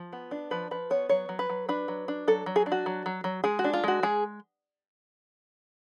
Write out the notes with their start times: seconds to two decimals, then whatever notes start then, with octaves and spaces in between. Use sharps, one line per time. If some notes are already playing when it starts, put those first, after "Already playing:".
Already playing: F3
0.13 B3
0.31 D4
0.51 F3 B4
0.71 F3 B4
0.90 B3 C#5
1.09 F#3 C#5
1.29 F#3
1.39 B4
1.50 F#3
1.69 D4 B4
1.88 F#3
2.08 D4
2.28 F#3 A4
2.46 F#3
2.56 G#4
2.66 D4
2.72 F#4
2.86 F#3
3.06 F#3
3.24 F#3
3.44 G#3 G#4
3.59 F#4
3.64 D4
3.73 F4
3.84 G#3 F#4
4.03 G#3 G#4